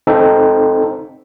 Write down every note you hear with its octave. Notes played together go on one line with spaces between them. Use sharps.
C4 D#4 A4